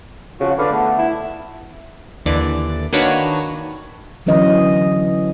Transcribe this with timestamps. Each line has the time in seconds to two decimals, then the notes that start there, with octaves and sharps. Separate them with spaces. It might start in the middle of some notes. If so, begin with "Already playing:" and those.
0.41 C#3 F3 F#4
0.59 D3 B4 D5 F5
0.72 A3 B3
0.99 E4
2.26 D#2 D3 E3 D5
2.93 D#3 A#3 D4 F#4 B4 C#5
4.26 D3 E3 F#3 C#4 D#5